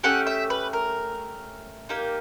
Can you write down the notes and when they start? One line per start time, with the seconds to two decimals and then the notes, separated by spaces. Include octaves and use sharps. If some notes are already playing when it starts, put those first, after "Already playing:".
0.04 A3 C#4 G4 F#5
0.27 E5
0.50 B4
0.73 A#4
1.89 A#3 D#4 G4